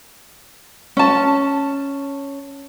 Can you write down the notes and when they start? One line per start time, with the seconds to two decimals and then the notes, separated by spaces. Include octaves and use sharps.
0.97 C#4 A5